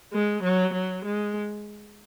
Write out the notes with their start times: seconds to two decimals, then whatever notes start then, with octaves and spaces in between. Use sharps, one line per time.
0.13 G#3
0.43 F#3
0.73 F#3
1.05 G#3